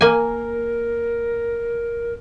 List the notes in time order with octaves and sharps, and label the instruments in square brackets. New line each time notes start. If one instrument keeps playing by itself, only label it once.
[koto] A#3 G#5 [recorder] A#4